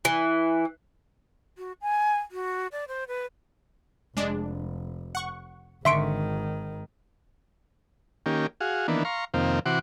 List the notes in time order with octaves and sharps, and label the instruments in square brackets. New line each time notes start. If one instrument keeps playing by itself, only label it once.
[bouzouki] E3
[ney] F#4
G#5
F#4
D5
C5
B4
[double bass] F1 [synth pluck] G#3 D4
[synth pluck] F#5 C#6
[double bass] G#1 D#3 [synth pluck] D3 C#6 B6 [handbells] E5 C6 D7
[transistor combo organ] D#3 A#3 C#4 G4
F#4 G#4 F5
D#3 E3 A#3 B3 D4
F5 A#5 C6 C#6
F2 C3 D#3 A#3 C4 F5
C3 E3 F#4 F#5 C6 D6